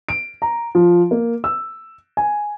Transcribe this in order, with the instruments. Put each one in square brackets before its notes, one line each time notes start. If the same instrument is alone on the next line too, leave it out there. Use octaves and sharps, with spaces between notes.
[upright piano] D7
A#5
F3
A#3
E6
G#5